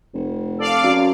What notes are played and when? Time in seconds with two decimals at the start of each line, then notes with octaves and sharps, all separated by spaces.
0.14 F1
0.58 A4 D5 F5
0.84 F#2